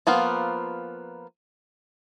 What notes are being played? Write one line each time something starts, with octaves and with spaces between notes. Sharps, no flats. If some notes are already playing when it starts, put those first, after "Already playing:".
F3 A#3 B3 F4